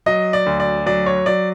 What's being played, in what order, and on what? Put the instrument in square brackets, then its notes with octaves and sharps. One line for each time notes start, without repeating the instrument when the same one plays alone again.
[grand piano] F#3 D#5
D5
D2
D5
F#3 D5
C#5
F#3 D5